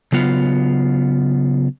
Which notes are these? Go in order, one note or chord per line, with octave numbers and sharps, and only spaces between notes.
C#3 F#3 B3 F4